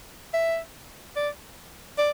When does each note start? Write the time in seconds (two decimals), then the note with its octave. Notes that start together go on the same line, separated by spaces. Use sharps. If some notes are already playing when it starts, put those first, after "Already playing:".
0.34 E5
1.16 D5
1.98 D5